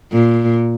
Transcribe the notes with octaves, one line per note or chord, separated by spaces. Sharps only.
A#2